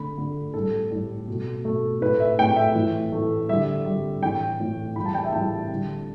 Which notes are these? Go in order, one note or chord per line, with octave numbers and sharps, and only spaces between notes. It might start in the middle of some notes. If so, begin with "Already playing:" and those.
Already playing: D3 A3 B5
D3 A3
A2 G3 A4
A2 G3
B2 A3
B2 A3
A2 A3 B4
E5
A2 A3 G5
E5
A2 E3 A3
A2 E3 A3
D3 G3 E5
D3 G3
A2 E3 A3 G5
A2 E3 A3
A2 E3 G3 B5
A5
G5
E5
A2 E3 G3 A5
D3 G3